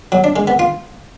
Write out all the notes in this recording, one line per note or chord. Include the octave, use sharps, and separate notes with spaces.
F#3
D4
G#3
B3
F4